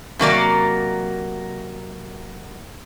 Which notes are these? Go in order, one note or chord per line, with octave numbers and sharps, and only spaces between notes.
C3 F#3 A#3 D5